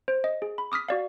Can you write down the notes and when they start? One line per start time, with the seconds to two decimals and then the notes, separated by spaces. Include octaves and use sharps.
0.08 C5
0.24 D#5
0.42 G#4
0.58 B5
0.72 D6 D#6 F6 B6
0.89 F#4 D5 F5